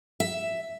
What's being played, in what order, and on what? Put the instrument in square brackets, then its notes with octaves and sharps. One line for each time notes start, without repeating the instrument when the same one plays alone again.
[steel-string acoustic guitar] E5